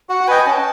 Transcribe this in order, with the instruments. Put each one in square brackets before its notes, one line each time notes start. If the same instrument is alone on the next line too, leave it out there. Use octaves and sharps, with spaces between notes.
[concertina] F#4 [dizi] F#5
[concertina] B4 D#5 G5 [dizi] G#5
[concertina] C#4 [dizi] A5